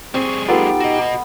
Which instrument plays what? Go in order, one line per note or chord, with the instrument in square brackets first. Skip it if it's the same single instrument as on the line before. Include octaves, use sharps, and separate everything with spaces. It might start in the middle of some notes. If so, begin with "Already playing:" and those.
[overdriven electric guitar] G3 G#4 [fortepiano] C4 [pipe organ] C#6
[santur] B3 [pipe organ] D#4 G4 G5 [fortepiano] F4 A4 B4
[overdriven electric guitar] F#4 D#5